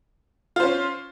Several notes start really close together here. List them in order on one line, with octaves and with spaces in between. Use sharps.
F4 C5 C#4